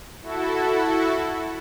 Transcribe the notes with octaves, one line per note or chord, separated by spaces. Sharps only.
E4 F#4 A4